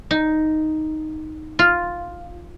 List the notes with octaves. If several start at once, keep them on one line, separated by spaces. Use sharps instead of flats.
D#4
F4